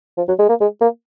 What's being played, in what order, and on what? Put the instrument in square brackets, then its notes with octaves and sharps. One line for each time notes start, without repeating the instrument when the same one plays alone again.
[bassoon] F3
F#3
G#3
A#3
G#3
A#3